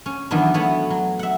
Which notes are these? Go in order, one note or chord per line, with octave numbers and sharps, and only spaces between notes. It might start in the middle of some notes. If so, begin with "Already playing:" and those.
C#4
D#3 E3 F#3 B3 D4
A3 B3 F#4 C#5 F#5
F#3
E5 F#5